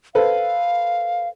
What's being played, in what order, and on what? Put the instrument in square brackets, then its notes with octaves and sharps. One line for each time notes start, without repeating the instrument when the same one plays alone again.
[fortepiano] A4 B4 C5 [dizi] F5